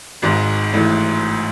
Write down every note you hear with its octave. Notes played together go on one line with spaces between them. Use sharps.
G#1 G#2
A1 A2